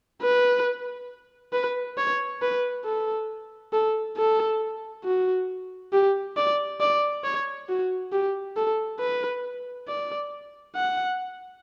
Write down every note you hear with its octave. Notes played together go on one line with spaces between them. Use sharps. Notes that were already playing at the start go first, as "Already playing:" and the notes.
B4
B4
C#5
B4
A4
A4
A4
F#4
G4
D5
D5
C#5
F#4
G4
A4
B4
D5
F#5